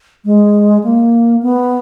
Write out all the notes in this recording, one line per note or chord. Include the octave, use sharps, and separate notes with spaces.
G#3
A#3
B3